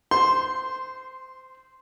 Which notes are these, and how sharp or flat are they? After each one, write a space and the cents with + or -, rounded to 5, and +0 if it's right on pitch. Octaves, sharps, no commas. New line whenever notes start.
C5 -20 C6 +0